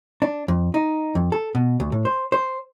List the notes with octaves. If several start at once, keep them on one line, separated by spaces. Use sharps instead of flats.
D4
F2
D#4
F2
A4
B2
D2
A2
C5
C5